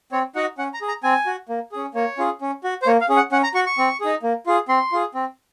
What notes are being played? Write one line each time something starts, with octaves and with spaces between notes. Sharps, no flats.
C4 C#5
D#4 F#4 F#5
C#4 F#5
A#5
G#4
A#5
C4 G#5
F#4
A#3
C#4 G#4
A#3 C#5
C#4 F4 G#4
C#4
F#4
C5
A#3 C#5
F5
C#4 G#4
F#5
C#4 F#5
A#5
F#4 C#6
C#6
C4
D#4 G#4
A#3
F4 G#4
C4 C6
F4 G#4
C4